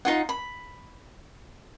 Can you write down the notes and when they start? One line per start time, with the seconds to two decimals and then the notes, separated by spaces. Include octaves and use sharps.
0.05 D#4 F4 F#5
0.29 B5